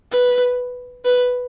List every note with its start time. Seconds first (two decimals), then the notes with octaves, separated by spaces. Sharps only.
0.12 B4
1.05 B4